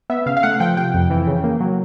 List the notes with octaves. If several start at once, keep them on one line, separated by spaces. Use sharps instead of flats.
B3 E5
C#3 F5
F5
A3 F#5
F3 G5
C3 G5
F2
E3
C#3
A#3
F#3